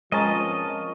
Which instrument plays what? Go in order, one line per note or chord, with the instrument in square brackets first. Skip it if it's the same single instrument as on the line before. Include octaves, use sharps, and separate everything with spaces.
[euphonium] F3 [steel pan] G#3 A#5 [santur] C4 C#4 A#4 [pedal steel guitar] D#5 A5